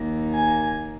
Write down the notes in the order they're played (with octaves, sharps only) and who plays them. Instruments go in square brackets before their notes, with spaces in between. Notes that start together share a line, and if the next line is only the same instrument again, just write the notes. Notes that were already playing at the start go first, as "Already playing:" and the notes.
Already playing: [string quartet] D#2 D#3 A#3
G#5